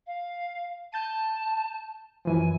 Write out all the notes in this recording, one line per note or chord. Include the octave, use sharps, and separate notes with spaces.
F5
A5 G6 A6 D#7
F#2 E3 F3 G#5